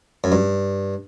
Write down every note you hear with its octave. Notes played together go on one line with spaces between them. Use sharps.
F#2
G2